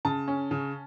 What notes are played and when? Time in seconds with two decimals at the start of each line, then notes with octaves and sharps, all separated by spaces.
0.05 C#3 A5
0.28 C#4
0.51 C#3